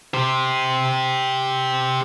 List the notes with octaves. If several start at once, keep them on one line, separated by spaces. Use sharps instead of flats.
G4 C5